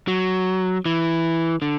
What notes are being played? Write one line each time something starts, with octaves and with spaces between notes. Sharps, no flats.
F#3
E3
D3